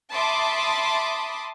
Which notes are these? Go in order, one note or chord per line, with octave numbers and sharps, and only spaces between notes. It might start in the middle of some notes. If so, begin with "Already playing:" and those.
E5 A5 B5 C6 D6 D#6